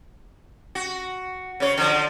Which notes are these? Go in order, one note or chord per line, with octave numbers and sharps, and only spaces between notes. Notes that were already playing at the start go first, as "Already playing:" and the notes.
F#4
C#3 C#5
D3 F3